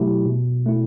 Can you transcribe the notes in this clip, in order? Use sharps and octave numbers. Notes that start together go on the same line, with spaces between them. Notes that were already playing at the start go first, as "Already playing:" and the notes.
Already playing: B2 F#3 A3 E4 G4
B2
A3 E4